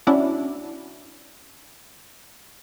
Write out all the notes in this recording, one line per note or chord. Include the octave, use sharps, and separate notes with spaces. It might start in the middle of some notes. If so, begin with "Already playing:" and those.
C#4 D4 E4 F#4